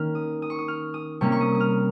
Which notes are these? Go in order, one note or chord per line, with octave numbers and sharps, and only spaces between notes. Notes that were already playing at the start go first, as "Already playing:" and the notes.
Already playing: D#3 A#3 C#4 F6
D#6
D#6
C#6
D#6
F6
D#6
C3 G3 A#3 C#4 C#6
C#6
D#6
D#6
F6